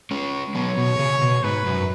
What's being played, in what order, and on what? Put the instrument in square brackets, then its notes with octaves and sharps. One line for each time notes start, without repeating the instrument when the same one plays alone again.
[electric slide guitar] G#3 C#4
[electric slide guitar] F#3 B3 [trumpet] C#5
[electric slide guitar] B2
C#3
B2
[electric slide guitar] G#2 [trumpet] B4
[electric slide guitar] F#2